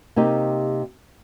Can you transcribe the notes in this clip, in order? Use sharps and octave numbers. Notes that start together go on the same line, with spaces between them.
C3 A#3 D#4 G4